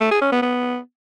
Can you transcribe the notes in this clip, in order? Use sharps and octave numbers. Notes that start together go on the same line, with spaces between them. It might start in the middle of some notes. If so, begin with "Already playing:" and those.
A3
G#4
C#4
B3
B3